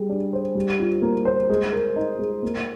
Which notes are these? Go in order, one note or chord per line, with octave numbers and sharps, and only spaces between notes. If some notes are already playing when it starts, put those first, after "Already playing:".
Already playing: G3 G#4
D4
C5
G3
F4
A#3
C5
G#3
A#4
D#4
G#3
A#3